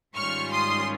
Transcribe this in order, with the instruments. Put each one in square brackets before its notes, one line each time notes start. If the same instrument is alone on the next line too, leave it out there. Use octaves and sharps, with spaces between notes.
[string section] G#2 D#3 G3 C#4 F4 C#6 F6
C6 D#6